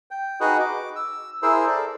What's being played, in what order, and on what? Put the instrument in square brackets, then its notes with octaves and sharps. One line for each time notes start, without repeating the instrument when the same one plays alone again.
[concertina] G5
D#4 F#4 G#4 B4 D#5
D6
E6
E4 G#4 A#4 C5 E6
A4 D5